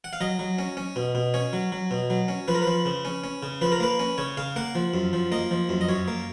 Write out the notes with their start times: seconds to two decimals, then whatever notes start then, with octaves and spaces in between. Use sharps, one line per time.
0.04 F#5
0.13 F5
0.21 F#3 D#5
0.39 F#3
0.59 C#4
0.77 C#4
0.96 B2
1.15 B2
1.34 C#4 C#5
1.53 F#3
1.72 F#3
1.91 B2
2.10 F#3
2.28 C#4
2.48 F3 B4
2.55 A#4
2.62 B4
2.67 F3
2.86 C#3
3.05 C#4
3.24 C#4
3.43 C#3
3.61 F3 B4
3.72 A#4
3.80 A#3 B4
4.00 C#4
4.18 C#3 C#5
4.37 C#3 F5
4.56 A#3 F#5
4.75 F3
4.94 F#2
5.13 F3
5.32 A#3 D#5
5.51 F3
5.69 F#2
5.81 D#5
5.89 F#2 C#5
6.08 A#3